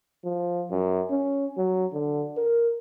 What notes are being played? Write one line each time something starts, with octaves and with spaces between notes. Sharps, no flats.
F3
F#2
C#4
F#3
D3
A#4